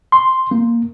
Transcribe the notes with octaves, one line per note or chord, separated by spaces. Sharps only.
C6
A#3